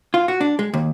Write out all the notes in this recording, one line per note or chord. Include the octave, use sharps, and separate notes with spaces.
F4
F#4
D4
G#3
D#2